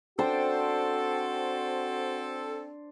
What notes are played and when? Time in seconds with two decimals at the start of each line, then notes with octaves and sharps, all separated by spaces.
0.19 C4 D4 F#4 A4 C5 G5